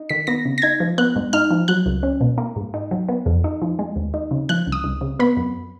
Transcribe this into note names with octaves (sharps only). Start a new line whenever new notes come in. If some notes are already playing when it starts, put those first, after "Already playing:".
Already playing: D#4
D#3 B6
B3 A#6
C#3
A#6
D#4 G#6
F3
B3 F#6
G#2
D#4 F6
F3
F#3 F#6
C#2
C#4
B2
A#3
G#2
D#4
F#3
B3
F2
D#4
F3
G#3
D#2
D#4
C#3
F3 F#6
C#2
D#6
C#2
C#3
B3 B5
F#2